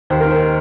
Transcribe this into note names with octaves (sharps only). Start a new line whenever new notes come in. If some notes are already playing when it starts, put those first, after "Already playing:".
D#2 C5
D#3 A#4
C5